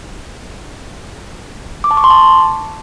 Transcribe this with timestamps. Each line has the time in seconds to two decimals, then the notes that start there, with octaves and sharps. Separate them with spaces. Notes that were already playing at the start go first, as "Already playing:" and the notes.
1.84 D6
1.91 A5
1.97 C#6
2.04 C6
2.10 A5